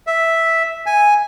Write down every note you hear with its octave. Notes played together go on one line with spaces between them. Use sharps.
E5
G#5